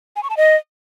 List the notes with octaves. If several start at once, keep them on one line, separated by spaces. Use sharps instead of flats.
G#5
C#6
A5
D#5